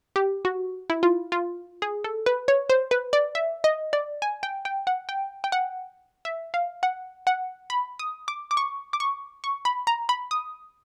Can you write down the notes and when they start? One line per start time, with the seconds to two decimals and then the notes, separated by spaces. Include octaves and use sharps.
0.16 G4
0.45 F#4
0.90 E4
1.03 F4
1.32 F4
1.82 G#4
2.04 A4
2.26 B4
2.48 C#5
2.70 C5
2.91 B4
3.13 D5
3.35 E5
3.64 D#5
3.93 D5
4.22 G#5
4.43 G5
4.65 G5
4.87 F#5
5.09 G5
5.44 G5
5.52 F#5
6.25 E5
6.54 F5
6.83 F#5
7.27 F#5
7.70 B5
7.99 D#6
8.28 D6
8.51 D6
8.57 C#6
8.93 D6
9.00 C#6
9.44 C#6
9.65 B5
9.87 A#5
10.09 B5
10.31 D#6